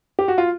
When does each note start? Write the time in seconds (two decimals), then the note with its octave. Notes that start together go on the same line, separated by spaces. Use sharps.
0.19 G4
0.28 F#4
0.38 F4